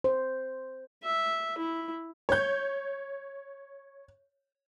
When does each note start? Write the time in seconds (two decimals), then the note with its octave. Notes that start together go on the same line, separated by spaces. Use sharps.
0.04 C5
1.03 E5
1.58 E4
2.29 C#5 G6